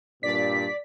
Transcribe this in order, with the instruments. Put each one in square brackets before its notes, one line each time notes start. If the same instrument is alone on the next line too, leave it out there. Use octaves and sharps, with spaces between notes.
[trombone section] G2 A#2 [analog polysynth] D5 [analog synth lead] B6